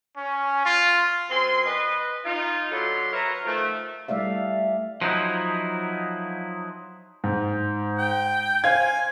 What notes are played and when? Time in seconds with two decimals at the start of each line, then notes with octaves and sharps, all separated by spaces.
0.17 C#4
0.65 F4
1.29 F#2 C4 G#5 C6
1.65 B4 D#5
2.24 D#4 F4
2.72 D3 F#3 A4 B5 C6
3.13 A#4 B4 C#5 E5 A#5
3.44 D#3 F3 A3
4.08 G3 A3 D5 E5 F5
5.02 F3 F#3 D#4 E4
7.24 G#2
7.98 G5
8.64 C5 F5 G#5 G#6